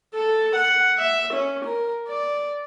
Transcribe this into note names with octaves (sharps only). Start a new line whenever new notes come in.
A4
F#5
E5
C#4
A#4
D5